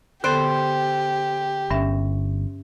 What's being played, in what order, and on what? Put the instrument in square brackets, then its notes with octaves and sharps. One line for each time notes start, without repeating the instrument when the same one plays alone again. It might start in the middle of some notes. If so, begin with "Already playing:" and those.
[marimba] D3 B3 A4 [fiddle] G4 [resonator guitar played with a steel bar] C5
[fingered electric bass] G1 [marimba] G2 C#4 E5